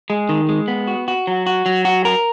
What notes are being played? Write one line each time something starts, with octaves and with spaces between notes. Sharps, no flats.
G#3
D#3
G#3
B3
F#4
F#4
F#3
F#4
F#3
F#4
A#4